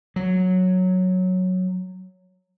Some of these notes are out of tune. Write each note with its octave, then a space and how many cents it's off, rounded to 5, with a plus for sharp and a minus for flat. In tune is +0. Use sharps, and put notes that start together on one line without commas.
F#3 -5